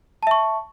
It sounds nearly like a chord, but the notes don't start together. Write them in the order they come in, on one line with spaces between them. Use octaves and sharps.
A5 E5 C#6